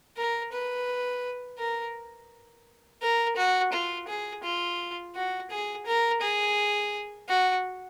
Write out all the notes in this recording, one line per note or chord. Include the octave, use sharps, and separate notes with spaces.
A#4
B4
A#4
A#4
F#4
F4
G#4
F4
F#4
G#4
A#4
G#4
F#4